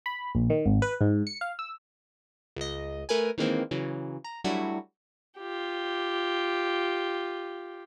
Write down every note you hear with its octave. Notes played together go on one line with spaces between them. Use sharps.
B5
A#1
D#3
G#1
B4
G#2
C#7
F5
E6
C#2 D#5
A3 A#4 B4 G#5
D#3 E3 G#3 A#3 C4
C#3 E3 F#3
A#5
F#3 G3 A3 D4 E4 F#4
F4 G4